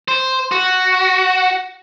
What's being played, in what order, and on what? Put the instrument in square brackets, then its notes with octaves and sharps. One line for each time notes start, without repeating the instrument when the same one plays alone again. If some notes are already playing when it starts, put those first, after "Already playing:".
[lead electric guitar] C5
F#4